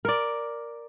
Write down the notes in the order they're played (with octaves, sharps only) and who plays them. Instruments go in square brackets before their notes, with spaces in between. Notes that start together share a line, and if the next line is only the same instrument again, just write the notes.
[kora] A#4 D5